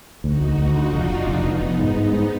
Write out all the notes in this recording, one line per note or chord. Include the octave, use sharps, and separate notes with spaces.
D2 D#4 F#4
D2
D2
D3 D4 F4
F1
F1
F1 B3 D#4
F1
F1
G#2
G#2
G#2